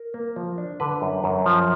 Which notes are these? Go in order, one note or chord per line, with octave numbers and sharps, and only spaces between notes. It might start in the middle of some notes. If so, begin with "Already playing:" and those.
Already playing: A#4
A#3
F3
D4
D3 B4
F#2
F#2
F3